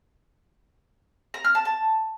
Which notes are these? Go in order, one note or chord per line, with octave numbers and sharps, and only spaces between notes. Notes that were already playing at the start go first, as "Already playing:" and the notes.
A#5
F6
A5
A5